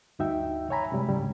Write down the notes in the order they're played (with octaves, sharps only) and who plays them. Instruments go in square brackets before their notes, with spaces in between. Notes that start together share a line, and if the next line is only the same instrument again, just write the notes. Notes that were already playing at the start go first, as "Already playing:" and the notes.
[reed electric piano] D2 G2 D#4 F#4 E5 G5
C#5 E5 G#5 A#5 B5
G2 C3 G3 G#3
D2 G#2 C#3 G3